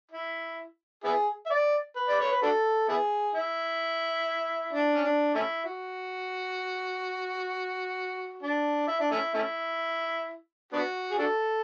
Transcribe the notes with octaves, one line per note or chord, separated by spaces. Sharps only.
E4
B3 E4 G#4
E5
D5
B4
D5
C#5
B4
D4 F#4 A4
B3 E4 G#4
E4
D4
C#4
D4
A3 C#4 E4
F#4
D4
E4
D4
A3 C#4 E4
A3 C#4 E4
B3 D4 F#4
G#4
D4 F#4 A4